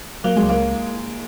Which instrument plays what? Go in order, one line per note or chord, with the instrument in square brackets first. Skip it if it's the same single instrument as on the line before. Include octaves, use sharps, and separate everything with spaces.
[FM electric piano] F#3 [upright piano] A#3
[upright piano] G#3
[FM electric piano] C#2
[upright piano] A#3